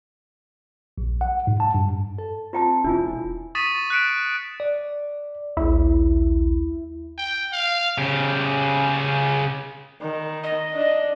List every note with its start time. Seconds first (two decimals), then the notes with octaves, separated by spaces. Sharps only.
0.98 A#1
1.21 F#5
1.47 G#2
1.60 A5
1.75 G2
2.18 A4
2.53 C4 F4 G5 A5
2.84 E1 D4 E4 F4 G#5
3.55 C#6 D#6 A6 B6 D#7 E7
3.90 F#6 B6 C#7 D7 E7
4.60 D5
5.57 A#1 D#2 E4
7.18 G5
7.53 F5
7.98 C#3 G4
10.02 D#3
10.44 D#5
10.74 D4